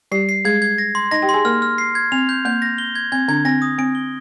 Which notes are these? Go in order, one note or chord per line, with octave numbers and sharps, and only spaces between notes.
G3 G4 C7
C7
G#3 G#4 G#6
G#6
A#6
C6
D#4 D#5 A#6
G4 G5
C6
G#4 G#5
A#3 A#4 F6
F6
C7
G#6
C4 F7
G6
A#3 G6
A#6
G7
G#6
C4 G#6
D3 D4 G#6
C4 A#6
D#6
C4 D7
G7